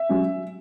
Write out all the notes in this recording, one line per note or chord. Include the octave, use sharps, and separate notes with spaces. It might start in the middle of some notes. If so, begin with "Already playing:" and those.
Already playing: E5
F#3 C#4